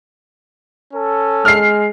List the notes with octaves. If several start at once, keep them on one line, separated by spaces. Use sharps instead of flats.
C#4 A4
G#3 F6 C7